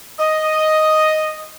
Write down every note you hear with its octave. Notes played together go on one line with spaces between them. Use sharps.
D#5